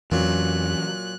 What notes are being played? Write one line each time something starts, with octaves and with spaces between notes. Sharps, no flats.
F2 A#2 E3 F#3 C#4 F#6